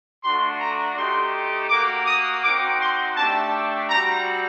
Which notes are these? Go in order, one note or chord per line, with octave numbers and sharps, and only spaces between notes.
A3 D4 F#4 C6
A#5
A3 D#4 G4 C6
A#3 F#4 D6
D#6
C4 D#4 F#4 D6
C6
A3 D4 G4 A5
G3 C4 F#4 A#5